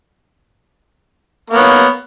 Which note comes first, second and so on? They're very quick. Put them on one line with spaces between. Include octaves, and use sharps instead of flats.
A#3 B3 C#5